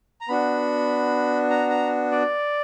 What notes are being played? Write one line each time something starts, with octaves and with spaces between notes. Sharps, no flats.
A#5
B3 D4 F#4 B5
A#5
A#5
D5